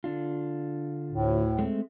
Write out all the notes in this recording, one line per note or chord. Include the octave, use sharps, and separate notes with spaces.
D3 D4 F4
D2 A2
G#3 A3 C4